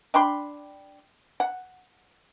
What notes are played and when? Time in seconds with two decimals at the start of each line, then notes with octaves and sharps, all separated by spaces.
0.14 D4 G5 B5 C6
1.40 F#5